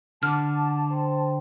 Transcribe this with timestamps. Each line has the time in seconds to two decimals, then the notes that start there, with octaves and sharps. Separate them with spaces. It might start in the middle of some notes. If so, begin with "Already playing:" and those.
0.23 D3 F#5 A5 D6 F6
0.90 C5 G5 C6